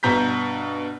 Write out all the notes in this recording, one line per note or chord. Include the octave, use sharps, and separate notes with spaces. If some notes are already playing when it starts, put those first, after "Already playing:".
G2 B2 A#5 G6 B6